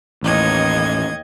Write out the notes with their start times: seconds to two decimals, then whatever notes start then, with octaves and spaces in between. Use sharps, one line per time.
0.23 A1 D#2 D#5 G#6